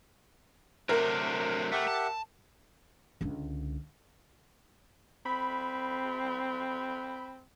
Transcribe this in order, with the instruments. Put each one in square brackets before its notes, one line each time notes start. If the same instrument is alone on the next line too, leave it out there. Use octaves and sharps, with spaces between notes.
[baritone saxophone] C3 [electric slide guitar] F#3 A3 D4 [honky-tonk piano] A#4
[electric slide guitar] A3 [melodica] G4 E5 F#5
[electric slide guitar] A5
[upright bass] C#2 D3
[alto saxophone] C4 [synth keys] B5